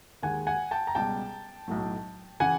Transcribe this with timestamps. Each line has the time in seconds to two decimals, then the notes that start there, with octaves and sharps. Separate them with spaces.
0.23 D#2 D#3 G#3 F#5 G#5
0.47 F#5 G#5
0.71 G5 A5
0.87 A#5
0.95 C#2 B2 G3 G5 A5
1.68 B1 A2 F#3
2.40 C#3 E3 F#5 G#5